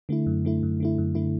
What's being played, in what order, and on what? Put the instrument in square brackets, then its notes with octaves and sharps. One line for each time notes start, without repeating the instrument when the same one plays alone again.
[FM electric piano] D3 A3 E4
F#2
D3 A3 E4
F#2
D3 A3 E4
F#2
D3 A3 E4